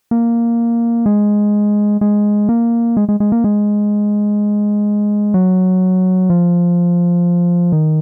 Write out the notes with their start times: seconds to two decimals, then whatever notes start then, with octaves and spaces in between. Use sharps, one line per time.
0.11 A#3
1.06 G#3
2.01 G#3
2.49 A#3
2.97 G#3
3.09 G#3
3.20 G#3
3.32 A#3
3.44 G#3
5.34 F#3
6.30 F3
7.72 D#3